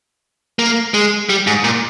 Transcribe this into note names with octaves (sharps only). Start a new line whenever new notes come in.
A#3
G#3
G3
G#2
A#2